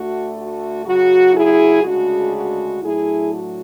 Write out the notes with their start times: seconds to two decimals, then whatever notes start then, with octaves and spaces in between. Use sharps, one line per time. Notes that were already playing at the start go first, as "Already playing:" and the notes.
Already playing: D2 D3 A3 F#4
0.35 F#4
0.84 F#2 C#3 F#3 F#4
1.34 E4 G#4
1.84 D2 C#3 G#3 D4 F#4
2.33 F#4
2.83 A2 F#3 A3 D4 E4 G#4
3.32 F#4